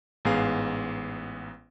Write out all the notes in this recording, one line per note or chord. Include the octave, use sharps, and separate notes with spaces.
A1 G#2 B3 G#4 F5